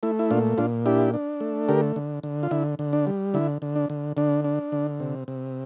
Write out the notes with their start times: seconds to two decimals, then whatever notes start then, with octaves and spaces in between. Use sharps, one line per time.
0.03 A3 E4
0.19 E4
0.30 A#2 D4 F4
0.58 A#2 D4 F4
0.86 D4 E4 G4
1.14 D4
1.41 A3
1.69 D3 G4 A#4
1.96 D3
2.23 D3
2.43 F4
2.51 D3 E4
2.79 D3
2.93 D4
3.07 G3
3.34 D3 E4
3.62 D3
3.76 D4
3.90 D3
4.17 D3 D4
4.44 D4
4.72 D3
5.00 C3
5.28 C3